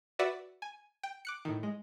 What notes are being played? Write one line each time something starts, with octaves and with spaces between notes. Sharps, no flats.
F#4 B4 D5 E5 F#5 D6
G#5
G5
D6 F#6 C#7
A2 D#3
G#3